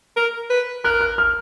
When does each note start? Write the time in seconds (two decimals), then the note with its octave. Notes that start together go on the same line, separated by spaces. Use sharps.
0.17 A#4
0.50 B4
0.85 A#4 F#6
1.01 F#6
1.18 F6